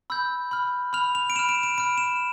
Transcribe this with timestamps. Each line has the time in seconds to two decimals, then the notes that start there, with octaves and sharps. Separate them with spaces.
0.10 B5 E6 G6
0.51 B5 F6
0.93 B5 F6 F7
1.15 F7
1.30 D7
1.35 B5 E7
1.39 F6
1.49 D7
1.63 D7
1.78 B5 F6 D7
1.98 E7